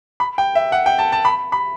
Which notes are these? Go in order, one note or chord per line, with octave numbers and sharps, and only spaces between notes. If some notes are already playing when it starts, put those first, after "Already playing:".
B5
G5
E5
F#5
G5
A5
A5
B5
B5